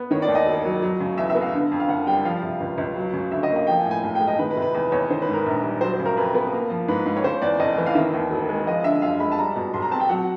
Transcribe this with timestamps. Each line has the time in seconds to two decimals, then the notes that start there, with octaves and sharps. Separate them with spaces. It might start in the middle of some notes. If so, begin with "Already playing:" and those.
Already playing: B3
0.11 D#3 C#5
0.22 D5
0.28 D#2
0.35 D#5
0.46 E1
0.65 F#3
0.82 F#3
1.00 C#3
1.18 E2 E5
1.30 E5
1.35 B3
1.42 F5
1.54 D3
1.71 F2
1.80 F5
1.89 F#1 F#5
2.07 G3 G5
2.25 F3 F5
2.43 C3
2.61 C#2
2.78 C#2
2.96 F#3
3.14 C#3
3.32 D2 E5
3.43 D#5
3.50 A#3
3.56 D#5
3.67 F3 G5
3.80 G#5
3.86 A2
3.91 G#5
4.03 B1 G#5
4.15 G5
4.20 G#3
4.27 D#5
4.39 D#3 B4
4.50 B4
4.57 C3
4.62 B4
4.74 E2 B4
4.92 E2 C#5
5.03 C#5
5.10 D#3 C5
5.22 B4
5.28 G#2
5.33 A#4
5.46 A#1
5.64 G3
5.81 F#3 C5
5.94 C5
6.00 C#3
6.05 A#4
6.17 F2 B4
6.35 B3
6.52 A#3
6.70 F3
6.88 G#2 B4
7.06 G#2
7.17 C#5
7.24 C#3 C5
7.42 E2 D5
7.60 F1 D#5
7.78 E3
7.86 F5
7.95 D#3 E5
8.14 D#2
8.31 E1
8.49 G#3
8.66 F3 D#5
8.84 D3 E5
9.02 F#2 F5
9.20 G#3 B5
9.32 A5
9.38 G3 A#5
9.56 B2
9.74 B1 C6
9.82 A#5
9.92 C4 A5
10.00 G5
10.09 F#3 F#5